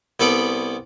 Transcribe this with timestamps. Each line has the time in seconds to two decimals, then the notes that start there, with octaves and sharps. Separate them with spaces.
0.20 C2 B3 A4 B4 D5